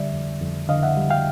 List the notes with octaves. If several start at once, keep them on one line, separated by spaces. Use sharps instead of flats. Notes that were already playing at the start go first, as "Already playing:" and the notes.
Already playing: D3 G3 D5 E5
F2
F2
D3 D#5 F5
E5 F#5
G3
F5 G5